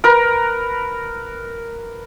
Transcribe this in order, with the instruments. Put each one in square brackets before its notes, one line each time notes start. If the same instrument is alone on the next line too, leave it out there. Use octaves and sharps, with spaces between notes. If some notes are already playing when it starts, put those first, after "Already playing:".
[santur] A#4 B4